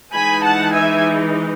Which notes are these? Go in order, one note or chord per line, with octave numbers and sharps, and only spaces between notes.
E3 G#3 D#4 G#5 B5
F#5 A5
E5 G#5